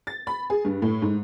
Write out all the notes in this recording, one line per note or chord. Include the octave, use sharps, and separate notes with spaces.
A6
B5
G#4
G2
A2
G#2